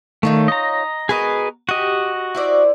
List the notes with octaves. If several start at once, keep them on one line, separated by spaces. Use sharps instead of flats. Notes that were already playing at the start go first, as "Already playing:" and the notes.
D#3 A3 D#4 F4 C#5
D#5 A#5
B3 F#4 G#4 A#4 B4 D#5
F#4 G4 D#5
E4 C5 D5